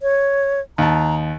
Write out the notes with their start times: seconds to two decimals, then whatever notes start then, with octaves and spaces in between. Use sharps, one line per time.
0.02 C#5
0.78 D#2 A5 A#5